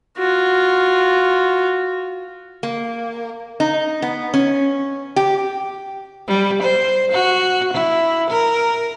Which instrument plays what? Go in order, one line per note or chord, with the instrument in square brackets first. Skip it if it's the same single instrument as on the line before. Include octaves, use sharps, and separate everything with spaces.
[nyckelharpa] F4 F#4
[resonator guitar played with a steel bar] A#3
D#4
B3
C#4
G4
[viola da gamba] G3
C5
F#4
E4
A#4